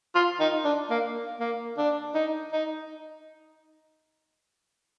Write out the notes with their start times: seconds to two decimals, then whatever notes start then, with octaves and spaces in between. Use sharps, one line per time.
0.15 F4
0.40 D#4
0.64 D4
0.90 A#3
1.40 A#3
1.77 D4
2.14 D#4
2.53 D#4